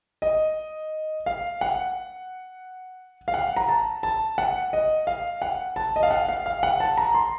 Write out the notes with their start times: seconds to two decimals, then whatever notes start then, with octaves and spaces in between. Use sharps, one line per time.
0.22 D#5
1.26 F5
1.61 F#5
3.28 F5
3.34 F#5
3.57 A#5
3.69 A5
4.03 A5
4.38 F#5
4.73 D#5
5.07 F5
5.42 F#5
5.76 A5
5.96 D#5
6.03 F5
6.11 F#5
6.29 F5
6.46 F5
6.63 F#5
6.80 A5
6.97 A#5
7.15 C6